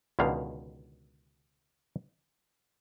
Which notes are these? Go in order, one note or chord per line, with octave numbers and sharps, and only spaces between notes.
C#2 B2 D3 D#3 F5